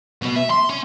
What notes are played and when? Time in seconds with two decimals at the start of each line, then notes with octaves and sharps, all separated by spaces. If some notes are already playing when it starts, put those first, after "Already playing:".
0.22 B2 B3
0.36 E5
0.50 C6
0.70 C#4